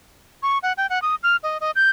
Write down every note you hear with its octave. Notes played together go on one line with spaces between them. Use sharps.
C#6
F#5
G5
F#5
D#6
F6
D#5
D#5
G6